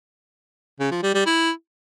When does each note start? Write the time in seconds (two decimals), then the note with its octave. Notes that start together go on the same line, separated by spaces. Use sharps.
0.80 C#3
0.91 F3
1.03 G3
1.15 G3
1.26 E4